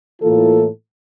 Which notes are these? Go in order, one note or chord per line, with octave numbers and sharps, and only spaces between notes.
A2 E3 A#3 F4 A4